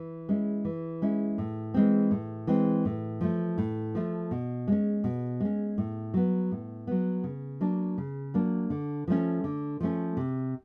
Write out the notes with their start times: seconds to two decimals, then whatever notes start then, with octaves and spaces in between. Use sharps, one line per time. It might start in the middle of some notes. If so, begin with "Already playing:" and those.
Already playing: E3
0.29 G#3 C#4 E4
0.65 E3
1.02 G#3 C#4 E4
1.38 A2
1.74 E3 G#3 C4
2.11 A2
2.47 E3 G#3 C4
2.85 A2
3.21 F3 A3
3.58 A2
3.95 F3 A3
4.31 B2
4.68 G#3 C#4
5.04 B2
5.40 G#3 C#4
5.78 A2
6.14 F#3 B3
6.51 A2
6.87 F#3 B3
7.24 C#3
7.61 F#3 A#3 D4
7.98 C#3
8.34 F#3 A#3 D4
8.70 D3
9.08 F3 A3 C#4
9.44 D3
9.81 F3 A3 C#4
10.17 C3